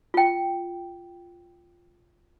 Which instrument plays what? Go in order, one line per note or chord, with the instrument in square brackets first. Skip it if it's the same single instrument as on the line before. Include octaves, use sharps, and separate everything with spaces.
[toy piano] F4 G5